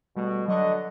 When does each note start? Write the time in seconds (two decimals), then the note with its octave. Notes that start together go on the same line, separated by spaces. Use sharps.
0.16 B2 G3 A3
0.48 D3 F#3 D#5 C#6 F#6